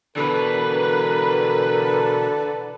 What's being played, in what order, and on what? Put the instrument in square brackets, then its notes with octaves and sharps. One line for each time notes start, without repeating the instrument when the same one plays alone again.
[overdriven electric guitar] B2 E3 [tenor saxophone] D3 [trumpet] A#4 [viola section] B4